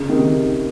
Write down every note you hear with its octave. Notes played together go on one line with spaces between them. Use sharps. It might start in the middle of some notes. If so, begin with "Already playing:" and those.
Already playing: C#3
C3 D#3